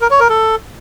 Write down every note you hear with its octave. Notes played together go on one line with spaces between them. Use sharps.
A#4
C#5
A#4
A4